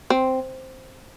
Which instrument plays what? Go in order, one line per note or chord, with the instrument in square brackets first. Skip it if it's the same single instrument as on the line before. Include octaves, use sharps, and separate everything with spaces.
[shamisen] C4